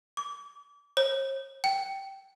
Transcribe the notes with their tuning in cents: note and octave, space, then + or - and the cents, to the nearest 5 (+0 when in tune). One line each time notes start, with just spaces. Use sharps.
D6 -35
C#5 -45
G5 -10